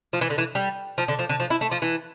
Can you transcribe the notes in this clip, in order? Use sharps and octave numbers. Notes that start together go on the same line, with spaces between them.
F3
E3
D3
E3
G3
F3
D3
F3
D3
F3
E4
A3
F3
E3